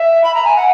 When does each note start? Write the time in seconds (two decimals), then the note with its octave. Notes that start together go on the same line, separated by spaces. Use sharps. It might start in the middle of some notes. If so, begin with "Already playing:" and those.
Already playing: E5
0.24 B5
0.34 A#5
0.45 G#5
0.56 F#5